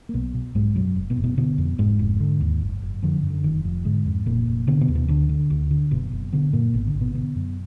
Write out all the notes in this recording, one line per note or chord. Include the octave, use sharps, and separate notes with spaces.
A#3
B1 B2 B3
B2
B1 G#2 G#3
F#2 B2 F#3
F#1
B2 B3
F#1
B2 B3
B2 D3 B3
F2
F1 G#2 G#3
F1
D3
D#2
F#1
F#1
F2 D3 F3
F#2
D3
F1 D#3
F1 F2 F3
G#2 D3 G#3
F2
F1 A#2 A#3
F1
B2 D3 B3
B2 B3
D#2
B2 B3
D2 D3 D4
D3
D2
D3
F#1 B2 B3
F#1
B2 D3 B3
F#2 A#2 A#3
G#1 B2 B3
D3 D4
G#1
B2 B3
B2 D3 B3
F#2